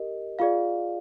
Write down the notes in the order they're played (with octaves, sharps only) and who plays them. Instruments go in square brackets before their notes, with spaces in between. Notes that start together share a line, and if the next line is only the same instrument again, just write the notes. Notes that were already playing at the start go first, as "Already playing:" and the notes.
Already playing: [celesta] G4 A#4 D#5
F4 G#4 D5 F5